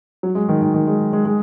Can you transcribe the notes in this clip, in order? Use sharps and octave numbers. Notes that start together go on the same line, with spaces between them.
F#3
G#3
D#3
D#3
D#3
G#3
G#3
G#3